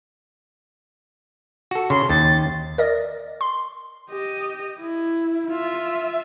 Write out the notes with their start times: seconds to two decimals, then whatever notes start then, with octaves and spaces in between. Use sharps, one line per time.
1.71 F#4 A4
1.90 C#3 C6
2.09 D#2 A6
2.78 A#4 D5 D#5
3.41 C6
4.10 G4 D#5
4.79 E4
5.51 F4 E5